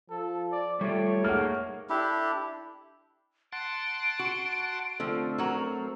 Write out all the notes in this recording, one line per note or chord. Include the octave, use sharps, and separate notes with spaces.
F3 A4
D5
G3 A3 F4 G4 C#5
G#3 A#3 D#4 F#5 F6
D4 E4 G4 A4
F#5 A5 C6 D7
F#4
D3 F3 A3 C4
F#3 F#4 A#4